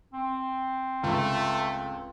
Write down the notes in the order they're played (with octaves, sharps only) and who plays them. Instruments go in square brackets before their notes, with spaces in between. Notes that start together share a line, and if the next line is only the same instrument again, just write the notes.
[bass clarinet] C4
[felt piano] C#2 [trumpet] A3